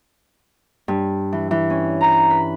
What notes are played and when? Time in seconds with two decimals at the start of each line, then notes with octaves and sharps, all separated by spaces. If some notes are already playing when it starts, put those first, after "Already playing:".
0.88 G2
1.33 E3
1.51 E3
1.70 C#4
2.01 A#5
2.30 B4